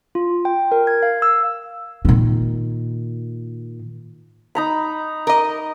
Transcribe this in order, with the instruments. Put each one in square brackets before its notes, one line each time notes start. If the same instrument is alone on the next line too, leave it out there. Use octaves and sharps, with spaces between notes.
[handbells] F4
G5
A#4
G#6
F5
E6
[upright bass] A#2 D#3
[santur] D#4 A#5 B5
[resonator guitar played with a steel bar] A#4 D#5